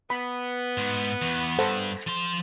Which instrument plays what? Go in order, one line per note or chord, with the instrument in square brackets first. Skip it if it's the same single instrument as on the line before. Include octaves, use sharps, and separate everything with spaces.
[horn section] B3 [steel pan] B5
[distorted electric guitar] G#2
E2
[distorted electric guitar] G2 [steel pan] A4 C5 F#5
[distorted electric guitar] F3 C6